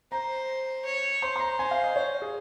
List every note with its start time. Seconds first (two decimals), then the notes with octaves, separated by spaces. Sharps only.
0.12 C5 A#5
0.85 C#5
1.22 C5 C6
1.36 C6
1.40 A#5
1.59 G#5
1.71 F5
1.84 D#5
1.96 C#5
2.22 G#4